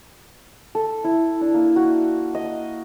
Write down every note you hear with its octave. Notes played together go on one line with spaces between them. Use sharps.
A4
E4
D4
A#3
F#4
D#5